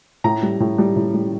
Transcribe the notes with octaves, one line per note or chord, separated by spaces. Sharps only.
A2 A#5
G3
A2
G3
A2
G3